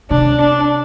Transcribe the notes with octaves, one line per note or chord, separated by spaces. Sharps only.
C3 D4
D4